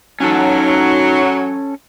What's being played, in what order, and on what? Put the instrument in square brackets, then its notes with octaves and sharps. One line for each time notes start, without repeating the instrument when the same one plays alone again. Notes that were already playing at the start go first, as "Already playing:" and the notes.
[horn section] F#3 [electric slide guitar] C#4 A4 [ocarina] D#4